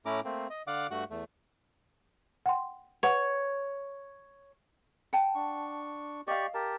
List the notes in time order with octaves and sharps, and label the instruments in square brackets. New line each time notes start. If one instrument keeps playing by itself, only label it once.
[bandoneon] A2 A3 C#4 E4 A#5 D6
A3 A#3 C4
D#5
D3 D5 F5 F#5 D6
G2 A3 F#4 F#5
E2 A3
[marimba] F#5 G5 C6
[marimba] B4 F#5 [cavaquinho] C#5
[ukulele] F#5 G5 A5
[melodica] D4 C#6
[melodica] G4 D5 C#6 [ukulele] D#5 F5
[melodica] G4 A#4 A5